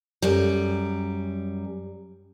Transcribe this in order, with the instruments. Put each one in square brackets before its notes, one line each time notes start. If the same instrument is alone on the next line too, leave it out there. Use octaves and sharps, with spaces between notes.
[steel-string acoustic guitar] F#2 G3